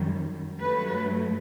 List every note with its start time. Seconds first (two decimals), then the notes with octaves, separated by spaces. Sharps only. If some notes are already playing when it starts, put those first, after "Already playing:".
Already playing: F#2 D#3 G3
0.60 G2 F#3 A3 B4